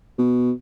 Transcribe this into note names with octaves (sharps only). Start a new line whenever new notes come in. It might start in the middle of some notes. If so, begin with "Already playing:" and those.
B2